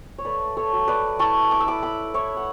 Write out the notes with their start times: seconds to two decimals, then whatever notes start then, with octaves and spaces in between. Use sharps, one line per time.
0.18 C#5
0.25 A3 B4 D5
0.57 A4 C#5
0.73 F#3
0.88 B4 D5
1.19 E4 A5 C#6
1.51 D6
1.60 E6
1.66 E4 B5 D6
1.83 B5 D6
2.14 E4 C#5 E5
2.37 F#5